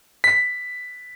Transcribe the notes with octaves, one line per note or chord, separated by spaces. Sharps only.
B6